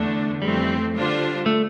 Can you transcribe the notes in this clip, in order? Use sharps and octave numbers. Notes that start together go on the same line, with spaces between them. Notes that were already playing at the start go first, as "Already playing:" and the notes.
Already playing: E2 D3 A3 D4
F2 E3 G3 A3 C4
D3 G3 D4 F4 C5
A3